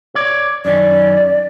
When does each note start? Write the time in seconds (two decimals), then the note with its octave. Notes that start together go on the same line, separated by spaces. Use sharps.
0.15 C#5 D5
0.65 F#2 D#3 C#4 D5